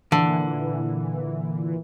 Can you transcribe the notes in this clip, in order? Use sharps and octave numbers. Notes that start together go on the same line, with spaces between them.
A#2 D3 E3